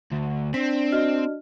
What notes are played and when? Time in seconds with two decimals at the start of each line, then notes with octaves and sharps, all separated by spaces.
0.12 D2
0.54 C4 D4 B6
0.92 F#4 D#5 F6